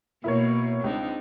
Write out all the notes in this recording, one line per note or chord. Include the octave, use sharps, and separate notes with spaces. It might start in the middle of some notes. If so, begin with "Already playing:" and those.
B2 A#3 E4 A#4 C#5
C#2 C4 D4 D#4